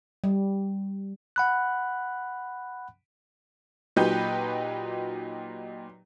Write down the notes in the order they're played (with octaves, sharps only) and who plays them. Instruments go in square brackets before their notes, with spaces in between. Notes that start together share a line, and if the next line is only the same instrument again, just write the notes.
[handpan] G3
[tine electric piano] F#5 B5 F#6
[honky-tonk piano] A#2 F#3 D#4 G4 B4 G6